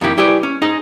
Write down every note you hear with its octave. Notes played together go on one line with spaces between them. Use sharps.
F2 D#3 A#3 E4 G4
G3 E4 G4 G#4 B4 D5
C#4
D#4 G#4 D#5